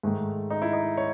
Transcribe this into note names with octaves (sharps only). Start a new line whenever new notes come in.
G#2 D#3 A3
D#4
E4
D#4
C#5